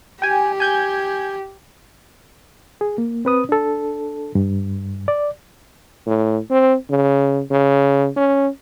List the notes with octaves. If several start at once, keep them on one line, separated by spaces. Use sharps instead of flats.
G4 G5 G#5
G#5 G6 G#6
G#4
A#3
C4 B4 D#6
D4 A4
G2
D5
A2
C4
C#3
C#3
C#4